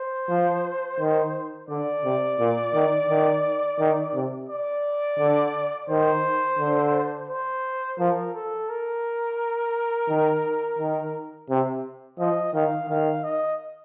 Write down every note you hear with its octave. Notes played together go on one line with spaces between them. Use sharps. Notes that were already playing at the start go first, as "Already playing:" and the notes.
Already playing: C5
F3
D#3
D3 D5
C3
A#2
D#3
D#3
D#3
C3
D5
D3
D#3 C5
D3
C5
F3 A#4
A4
A#4
D#3
D#3
C3
F3 D#5
D#3 F5
D#3 F5
D#5